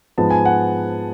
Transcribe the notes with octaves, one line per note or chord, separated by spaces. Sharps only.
G#2 F3 G#3 B3 A5
G#5
F#5